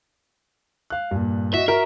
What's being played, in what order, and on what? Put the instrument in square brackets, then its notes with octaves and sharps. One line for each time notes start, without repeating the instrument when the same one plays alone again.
[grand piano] F5 F#6
G2 A#2
[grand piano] F#4 D#5 [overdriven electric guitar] E5
[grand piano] F#4 [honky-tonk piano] A#4 [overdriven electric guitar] E5